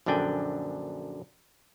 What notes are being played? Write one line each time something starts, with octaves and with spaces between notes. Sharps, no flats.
A#1 F#2 D3 D4 G5 G#5